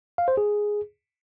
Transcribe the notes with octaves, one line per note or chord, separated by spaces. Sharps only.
F5
C5
G#4